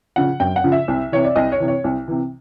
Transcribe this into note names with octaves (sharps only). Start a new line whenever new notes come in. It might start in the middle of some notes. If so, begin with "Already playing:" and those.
C#3 F3 F#5
F#2 G5
F#5
C#3 F3
E5
C2
C3 E3 C#5
D5
C2 D#5
C#5
C3 E3
C#5
C2
C3 E3